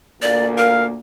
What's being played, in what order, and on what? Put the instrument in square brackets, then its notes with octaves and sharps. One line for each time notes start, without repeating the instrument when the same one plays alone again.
[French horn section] D2 A#2 A#3 [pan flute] D5
[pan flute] A#4 [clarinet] F5